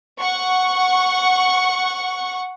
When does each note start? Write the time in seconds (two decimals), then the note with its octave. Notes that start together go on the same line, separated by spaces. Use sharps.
0.19 F#5 C#6